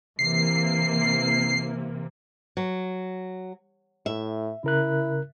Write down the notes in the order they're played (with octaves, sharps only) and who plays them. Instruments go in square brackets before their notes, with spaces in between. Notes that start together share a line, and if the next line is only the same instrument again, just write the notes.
[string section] C3 E3 A#3 [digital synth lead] C7
[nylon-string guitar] F#3
[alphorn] A2 [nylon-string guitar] E5
[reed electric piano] C#3 A#4 F#6 [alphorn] E4